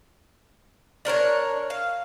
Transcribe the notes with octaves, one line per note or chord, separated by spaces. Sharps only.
D4 A#4 C5 C#5
F5